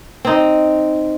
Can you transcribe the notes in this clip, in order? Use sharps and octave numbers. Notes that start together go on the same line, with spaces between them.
C4 D#4